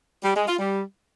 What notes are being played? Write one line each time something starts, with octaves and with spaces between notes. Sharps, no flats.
G3
G#3
F4
G3